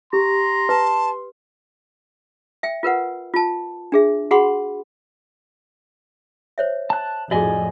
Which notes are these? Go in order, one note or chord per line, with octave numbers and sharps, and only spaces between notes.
G4 A#5 C6
B4 A5
E5 G5
F4 A#4 B4 F#5
F4 A5
D4 G#4 E5
F#4 G#4 F#5 B5 C6
C5 C#5 E5
A5 F#6
F2 A2 F#4 G#4 D5 D#5 G#5